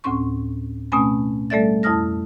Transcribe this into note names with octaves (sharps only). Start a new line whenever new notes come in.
D2 A2 C4 C#4 C6 C#6
B2 A3 C4 C#4 G#5 B5
G3 A3 A4 D5 E5 A6
F2 E4 A5 D#6 F6 A#6